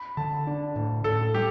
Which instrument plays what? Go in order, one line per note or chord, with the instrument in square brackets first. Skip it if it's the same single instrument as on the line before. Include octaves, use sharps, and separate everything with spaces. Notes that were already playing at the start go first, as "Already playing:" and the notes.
Already playing: [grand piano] B5
[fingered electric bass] D3 [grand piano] A5
[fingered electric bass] D4
A2
[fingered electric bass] A2 [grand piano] A4
[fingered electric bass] G3 [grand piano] G4